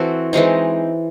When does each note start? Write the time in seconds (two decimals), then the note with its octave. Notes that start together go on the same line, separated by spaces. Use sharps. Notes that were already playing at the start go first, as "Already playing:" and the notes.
Already playing: E3 C4 F#4 A4
0.33 E3 G#3 C4 D#4